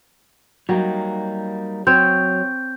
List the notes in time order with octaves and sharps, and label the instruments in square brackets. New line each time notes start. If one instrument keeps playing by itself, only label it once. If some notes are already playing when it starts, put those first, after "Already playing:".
[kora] F#3 [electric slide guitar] G3 A#3 D#4
[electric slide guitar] F#3 [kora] C4 C#5 [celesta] G6